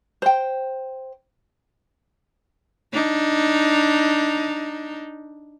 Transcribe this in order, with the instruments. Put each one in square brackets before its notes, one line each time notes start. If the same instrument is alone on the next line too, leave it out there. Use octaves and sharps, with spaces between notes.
[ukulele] C5 G5
[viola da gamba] D4 D#4